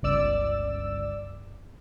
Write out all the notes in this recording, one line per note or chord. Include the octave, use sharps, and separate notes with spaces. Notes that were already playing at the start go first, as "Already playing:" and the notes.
G1 C#2 D5 E6